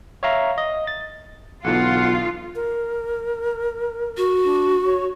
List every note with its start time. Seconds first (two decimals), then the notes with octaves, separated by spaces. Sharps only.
0.23 C#5 E5 F5 A#5
0.58 D#5
0.87 A6
1.65 B1 B2 D3 E3 F4 F#5
2.55 A#4
4.17 F#4
4.44 D4
4.86 C#5